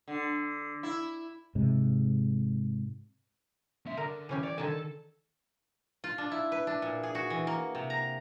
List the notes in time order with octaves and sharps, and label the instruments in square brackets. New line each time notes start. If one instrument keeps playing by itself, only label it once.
[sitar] D3
E4
[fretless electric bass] G#2 C3 G#3
[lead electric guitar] C#4 E5
[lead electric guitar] D3 [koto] A#4
[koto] E3 C#4 G4
[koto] C#5 [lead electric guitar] D5
[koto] D3 D#3 G#5 [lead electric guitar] A4
[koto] F4
D4
E4
B4
D4
A#2
G#4
F#4
E3
A#3
C3
A#5